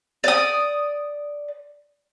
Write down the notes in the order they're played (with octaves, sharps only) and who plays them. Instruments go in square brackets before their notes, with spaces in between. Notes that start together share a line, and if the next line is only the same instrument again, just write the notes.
[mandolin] D5 D#6